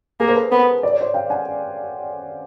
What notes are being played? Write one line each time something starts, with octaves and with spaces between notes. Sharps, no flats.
A#3 G#4 A#4
C5
A4 B4
B3 A#4 C5
D5
C#5
C5 D5
F5 G5
F#5 G#5